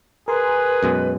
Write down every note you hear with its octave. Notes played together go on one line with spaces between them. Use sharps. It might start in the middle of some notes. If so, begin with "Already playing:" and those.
G#4 A#4 B4 G#5 C6
F#2 B2 G#3